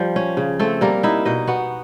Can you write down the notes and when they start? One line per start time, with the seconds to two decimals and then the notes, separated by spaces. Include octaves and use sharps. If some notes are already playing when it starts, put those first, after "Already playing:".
Already playing: F3 G3 G4
0.16 C#4
0.37 C#3
0.59 A3 C4 A4
0.81 G3 A#3 A#4
1.03 D#4 E4 E5
1.25 B2 D#4 D#5
1.47 B3 F#4 F#5